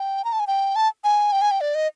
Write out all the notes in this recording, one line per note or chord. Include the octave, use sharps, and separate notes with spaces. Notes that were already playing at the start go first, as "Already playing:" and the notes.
Already playing: G5
A#5
A5
G#5
G5
A5
G#5
G5
G#5
G5
D5
D#5